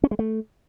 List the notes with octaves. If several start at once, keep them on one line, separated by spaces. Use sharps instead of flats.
C#4
G#3
A3